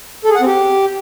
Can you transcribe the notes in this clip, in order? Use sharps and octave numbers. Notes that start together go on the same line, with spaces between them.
A4
G#4
F#5
C4
G4